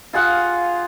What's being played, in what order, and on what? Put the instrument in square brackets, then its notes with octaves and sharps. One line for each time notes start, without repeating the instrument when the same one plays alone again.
[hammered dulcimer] F4 G#4 F5 F#5